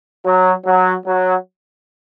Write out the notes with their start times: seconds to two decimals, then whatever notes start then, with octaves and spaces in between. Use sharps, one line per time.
0.25 F#3
0.65 F#3
1.06 F#3